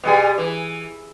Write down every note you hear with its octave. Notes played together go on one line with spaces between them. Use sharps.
B2 G3 G#4
E3